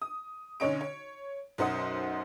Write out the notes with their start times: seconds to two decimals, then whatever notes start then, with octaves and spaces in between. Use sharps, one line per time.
0.02 D#6
0.60 B1 D3 C#4 C#5 D#5 D7
0.81 C#5
1.58 B1 F#2 C5 F#5 D#6